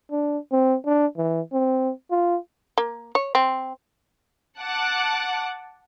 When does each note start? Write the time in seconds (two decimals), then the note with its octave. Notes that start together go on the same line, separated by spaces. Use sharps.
0.12 D4
0.52 C4
0.86 D4
1.17 E3
1.53 C4
2.11 F4
2.78 A#3
3.15 C#5
3.35 C4
4.58 F#5 A5 D6 F#6